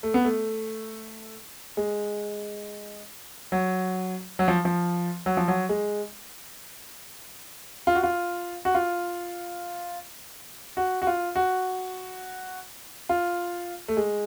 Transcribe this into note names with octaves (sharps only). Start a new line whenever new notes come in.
A3
B3
A3
G#3
F#3
F#3
F3
F3
F#3
F3
F#3
G#3
F4
F#4
F4
F#4
F4
F#4
F#4
F4
F#4
F4
A3
G#3